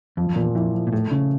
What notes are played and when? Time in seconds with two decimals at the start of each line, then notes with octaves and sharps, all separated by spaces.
0.17 F2 F3
0.29 F2
0.36 E2 A#2
0.55 F2 E4
0.74 F3
0.87 A#2
0.93 A2 A3
1.11 C#3 C#4